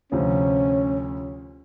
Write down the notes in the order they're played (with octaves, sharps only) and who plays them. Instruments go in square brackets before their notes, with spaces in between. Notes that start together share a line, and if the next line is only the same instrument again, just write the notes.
[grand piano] D2 C3 F3 [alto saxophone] C#4